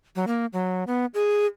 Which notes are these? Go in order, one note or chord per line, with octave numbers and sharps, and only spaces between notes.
F#3
A#3
F#3
B3
G#4